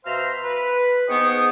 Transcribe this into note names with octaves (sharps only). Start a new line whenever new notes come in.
B2 C5 E5 F5 A#5 C6
B4
G#2 B3 G#4 G5 C#6 D#6